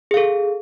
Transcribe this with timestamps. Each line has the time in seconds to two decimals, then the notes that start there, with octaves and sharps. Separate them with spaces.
0.11 G#4
0.14 F5
0.17 A4